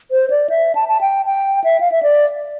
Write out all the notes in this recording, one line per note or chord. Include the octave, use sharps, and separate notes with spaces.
C5
D5
E5
A5
A5
G5
G5
E5
F5
E5
D5